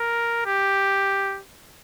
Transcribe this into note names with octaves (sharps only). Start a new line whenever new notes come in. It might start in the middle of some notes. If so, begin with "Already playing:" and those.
Already playing: A#4
G4